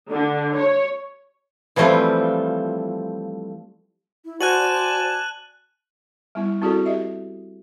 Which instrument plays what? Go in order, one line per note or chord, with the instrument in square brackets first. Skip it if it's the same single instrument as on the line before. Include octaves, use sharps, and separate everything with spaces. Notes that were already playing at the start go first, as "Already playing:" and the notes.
[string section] D3
C#5
[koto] E3 F3 G3 A3 C4 F4
[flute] E4
[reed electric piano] F#4 [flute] C5 [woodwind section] D5 G#5 A5 [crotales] F#6 D#7 F#7
[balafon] G3 B3 E4
C4 E4 F#4 G#4 A4 D5
G4 D#5 E5